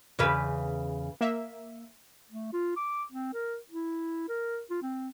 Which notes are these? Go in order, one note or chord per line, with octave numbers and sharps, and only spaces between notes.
E2 C#3 B4
A#3 E5
A3
F4
D6
C4
A#4
E4
A#4
F4
C4